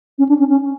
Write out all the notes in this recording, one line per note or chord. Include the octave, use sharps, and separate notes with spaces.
C#4
D4
C#4
C#4